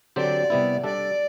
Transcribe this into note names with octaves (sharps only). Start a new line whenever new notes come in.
D3 F#3 C4 G4 D5
C3 G3 B3 E4
G3 D4 A4 D5